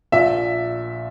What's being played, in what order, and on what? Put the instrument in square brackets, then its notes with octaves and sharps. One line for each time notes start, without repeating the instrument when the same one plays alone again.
[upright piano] A#1 A#2 E5